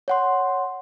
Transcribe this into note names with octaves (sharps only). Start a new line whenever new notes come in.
C#5 F#5 C6